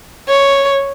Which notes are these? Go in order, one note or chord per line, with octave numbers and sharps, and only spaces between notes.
C#5